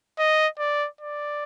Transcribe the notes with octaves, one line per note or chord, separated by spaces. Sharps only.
D#5
D5
D5